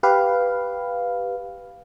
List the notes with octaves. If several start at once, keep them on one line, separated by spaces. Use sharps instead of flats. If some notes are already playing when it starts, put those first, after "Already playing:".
G4 B4 F5